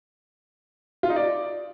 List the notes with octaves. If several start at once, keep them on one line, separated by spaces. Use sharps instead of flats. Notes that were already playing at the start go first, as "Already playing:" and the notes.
F4
D#4
D5